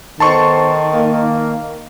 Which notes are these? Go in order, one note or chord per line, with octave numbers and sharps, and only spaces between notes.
D#3 B3 A4 C5 A5 C6 C#6
A#3